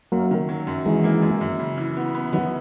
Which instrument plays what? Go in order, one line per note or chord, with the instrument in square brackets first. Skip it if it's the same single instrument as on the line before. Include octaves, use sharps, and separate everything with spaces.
[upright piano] F#2 [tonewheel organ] F#3 A#3
[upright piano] D#3
F#3
F#2
[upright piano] D#3 [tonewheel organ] E3 G#3
[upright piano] A#3
F#2
F#2
C#3
E3
B3
B3
[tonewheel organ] D#3 F#3 [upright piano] B3